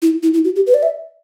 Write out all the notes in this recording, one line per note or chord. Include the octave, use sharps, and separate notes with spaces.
E4
E4
E4
F#4
G4
B4
D5
E5